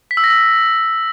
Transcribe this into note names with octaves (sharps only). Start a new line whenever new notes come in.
B6
E6
A#6
E6
B6